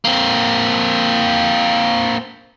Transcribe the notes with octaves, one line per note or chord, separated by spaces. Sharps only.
A#3 C4